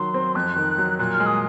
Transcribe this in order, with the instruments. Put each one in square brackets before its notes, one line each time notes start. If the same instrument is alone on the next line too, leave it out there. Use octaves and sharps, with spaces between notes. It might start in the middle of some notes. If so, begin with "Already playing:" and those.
Already playing: [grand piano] D#3 F#3 [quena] C6
[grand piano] C4
[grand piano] F2 [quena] F#6
[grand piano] D#3
F#3
[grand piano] A#2 [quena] F#6
[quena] F6
[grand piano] G#3
[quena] D#6